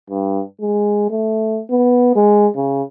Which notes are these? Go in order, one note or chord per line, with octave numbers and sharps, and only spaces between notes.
G2
G#3
A3
B3
G#3
C#3